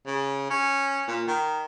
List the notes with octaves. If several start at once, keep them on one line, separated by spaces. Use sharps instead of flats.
C#3
C#4
A#2
D#3